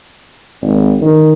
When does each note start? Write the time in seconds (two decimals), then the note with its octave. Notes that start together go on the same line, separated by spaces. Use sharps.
0.62 G#1
1.02 D#3